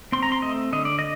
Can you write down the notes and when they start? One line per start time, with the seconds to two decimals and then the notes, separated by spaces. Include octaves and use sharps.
0.12 C4 C6
0.23 A#5
0.32 C6
0.42 A3 D#5
0.73 D3 D#5
0.85 D5
0.99 D#5